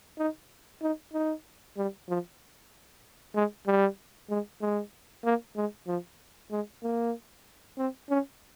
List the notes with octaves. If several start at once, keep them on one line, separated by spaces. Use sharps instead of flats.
D#4
D#4
D#4
G3
F3
G#3
G3
G#3
G#3
A#3
G#3
F3
G#3
A#3
C4
C#4